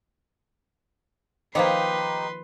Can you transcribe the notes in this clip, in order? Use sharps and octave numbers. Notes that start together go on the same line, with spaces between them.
D#3 F3 A#3 D#4 G4 B4 C6